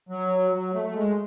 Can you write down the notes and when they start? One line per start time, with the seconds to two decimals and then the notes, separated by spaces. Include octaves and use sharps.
0.09 F#3
0.52 F#3
0.73 A3
0.85 A3
0.95 G#3